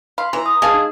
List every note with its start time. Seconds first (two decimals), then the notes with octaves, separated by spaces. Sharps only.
0.18 F5 B5 C6
0.33 E3 A#5
0.46 D#6
0.62 G#3 G#4 F5 A5
0.74 D#4